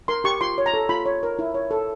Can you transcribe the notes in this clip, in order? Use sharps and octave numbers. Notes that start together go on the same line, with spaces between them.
A#4 C6
G4 C#6
F4 C6
C#5
A#5
A4
F4 B5
C#5
A#4
E4
C#5
A4